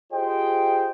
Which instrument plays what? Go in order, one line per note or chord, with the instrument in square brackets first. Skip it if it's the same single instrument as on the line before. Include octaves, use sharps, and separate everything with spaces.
[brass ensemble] F4 G4 G#4 C5 D#5 G5